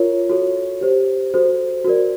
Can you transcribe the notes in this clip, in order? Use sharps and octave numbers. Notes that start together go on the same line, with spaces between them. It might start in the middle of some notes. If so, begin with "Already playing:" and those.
Already playing: F4 A#4 C#5
F#4 A4 C#5
G4 C5
F#4 A4 C5
F#4 A#4 D5